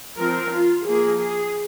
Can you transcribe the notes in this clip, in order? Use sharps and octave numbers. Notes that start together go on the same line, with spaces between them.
F3 C4 A#4
F4
F3 A#3 G#4
G#4